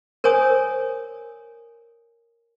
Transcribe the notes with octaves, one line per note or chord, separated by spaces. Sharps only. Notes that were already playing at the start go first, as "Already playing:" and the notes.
A#4 C5 C#5 G#5 D#6